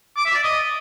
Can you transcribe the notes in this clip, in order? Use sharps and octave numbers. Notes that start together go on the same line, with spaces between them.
D6
E5
D5
D#5